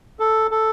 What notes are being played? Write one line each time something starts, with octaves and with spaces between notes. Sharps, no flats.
A4
A4